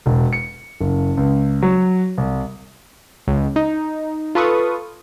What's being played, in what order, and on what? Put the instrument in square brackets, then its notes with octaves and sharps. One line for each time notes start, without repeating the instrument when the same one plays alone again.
[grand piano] E1
C#7
F#1
C#2
F#3
C2
[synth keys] C#2
D#4
F4 A4 B4 C#6 D#6